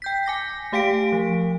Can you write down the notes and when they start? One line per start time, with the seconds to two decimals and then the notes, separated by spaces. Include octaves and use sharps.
0.02 G5 G6 B6
0.26 G#5 D6 A#6
0.72 A3 G4 F5 G5 B6 D7
1.13 F3